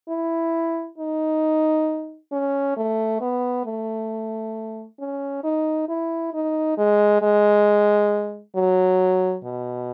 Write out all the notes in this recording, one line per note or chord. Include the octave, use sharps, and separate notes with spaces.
E4
D#4
C#4
A3
B3
A3
C#4
D#4
E4
D#4
G#3
G#3
F#3
B2